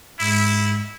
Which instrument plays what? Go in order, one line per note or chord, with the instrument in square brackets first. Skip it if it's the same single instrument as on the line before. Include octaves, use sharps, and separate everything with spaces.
[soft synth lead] G#2 [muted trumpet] E4